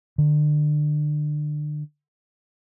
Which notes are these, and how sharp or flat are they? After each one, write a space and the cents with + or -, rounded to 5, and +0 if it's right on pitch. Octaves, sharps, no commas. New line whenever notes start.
D3 +30